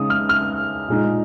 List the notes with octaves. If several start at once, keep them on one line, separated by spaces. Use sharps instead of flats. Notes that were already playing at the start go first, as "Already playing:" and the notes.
Already playing: C#3 G#3 D#4 D#6
F6
F6
A#2 G#3 D#4